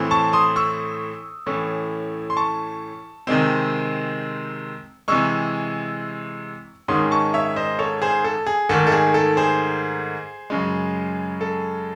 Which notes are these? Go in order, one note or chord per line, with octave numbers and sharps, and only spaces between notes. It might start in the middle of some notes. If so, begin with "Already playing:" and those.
Already playing: A2 E3 A3 C4
A5 C#6
C6 D#6
C#6 E6
A2 E3 A3 C#4
C6
A5 C#6
C3 D#3 G#3 C4
C3 E3 G#3 C#6 E6
G#2 D#3 G#3 C#4 C6 D#6
A5 C#6
C#5 E5
C5 D#5
A4 C#5
G#4 C5
A4
G#4
G#2 D#3 A3 A4
A4
G#4
A4
G#4 C5
F#2 C#3 G#3
A4